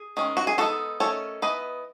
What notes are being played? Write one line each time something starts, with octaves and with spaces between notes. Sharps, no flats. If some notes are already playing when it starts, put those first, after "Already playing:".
Already playing: G#4
D#3 G#3 C#4
F#4
G#4
G#3 B3 D#4 F#4 A4
D#3 A3 C#4 A4 C#5
E3 B3 D#4 B4 D#5